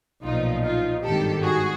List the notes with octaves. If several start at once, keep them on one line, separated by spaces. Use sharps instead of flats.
B1 A#2 F3 D#4 F4
D#4 F4
G#1 G2 D#3 G4 A4
F#4 G#4